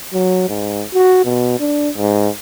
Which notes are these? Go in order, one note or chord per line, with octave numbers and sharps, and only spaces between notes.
F#3
G#2
F#4
B2
D4
G#2